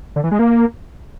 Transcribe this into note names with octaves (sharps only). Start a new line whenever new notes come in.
D3
E3
G#3
A#3